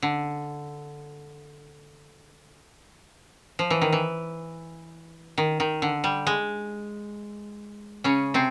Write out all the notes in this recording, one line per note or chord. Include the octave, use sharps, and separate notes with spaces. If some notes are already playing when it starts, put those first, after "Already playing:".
D3
F3
E3
D#3
E3
D#3
D#3
D3
G3
G#3
C#3 C#4
C3 C4